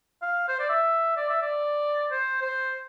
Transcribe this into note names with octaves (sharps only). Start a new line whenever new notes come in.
F5
C5
D5
E5
D5
E5
D5
C5
C5